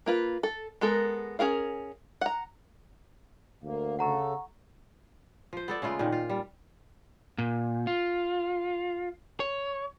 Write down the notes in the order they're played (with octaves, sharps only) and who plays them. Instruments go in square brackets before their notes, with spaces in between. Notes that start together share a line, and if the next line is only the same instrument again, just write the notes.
[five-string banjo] A#3 F4 B4
A4
G#3 B3 A4 A#4
C#4 G#4 A#4 F5
F#5 A#5
[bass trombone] D2 [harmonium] A#3
[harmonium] C#3 A4 [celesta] F#5 A#5 C#6
[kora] F3 C5
B3 A4 D5
C#3 G#3 A3 F4
A#2 D#3
F4
G3
[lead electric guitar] A#2
F4
C#5